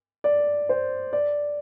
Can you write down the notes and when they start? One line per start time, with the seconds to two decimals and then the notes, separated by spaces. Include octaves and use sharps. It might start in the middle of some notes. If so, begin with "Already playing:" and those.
0.24 D5
0.69 C5
1.13 D5